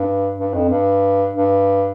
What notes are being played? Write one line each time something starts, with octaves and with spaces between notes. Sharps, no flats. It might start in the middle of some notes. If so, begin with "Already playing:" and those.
Already playing: G2
G2
F2
G2
G2